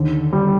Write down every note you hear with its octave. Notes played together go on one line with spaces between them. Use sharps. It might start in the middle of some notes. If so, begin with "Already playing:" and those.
Already playing: D#2 D3
G3